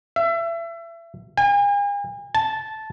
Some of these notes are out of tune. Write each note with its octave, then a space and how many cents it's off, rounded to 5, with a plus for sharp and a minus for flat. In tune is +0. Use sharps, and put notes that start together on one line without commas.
E5 +30
G#5 -45
A5 -10